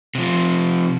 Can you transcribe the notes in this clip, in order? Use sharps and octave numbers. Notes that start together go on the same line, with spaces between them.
C3 F3